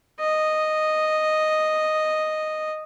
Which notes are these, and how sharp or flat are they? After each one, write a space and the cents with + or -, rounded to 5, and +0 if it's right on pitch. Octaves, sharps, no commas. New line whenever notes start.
D#5 -5